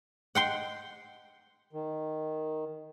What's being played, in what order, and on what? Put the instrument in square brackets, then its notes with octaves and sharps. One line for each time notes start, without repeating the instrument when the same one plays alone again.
[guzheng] F#5 G5 C6
[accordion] D#3